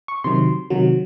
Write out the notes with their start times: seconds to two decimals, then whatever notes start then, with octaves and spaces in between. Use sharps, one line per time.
0.08 C#6
0.24 C3 D#3 F#3 C6
0.70 C3 D#3 F#3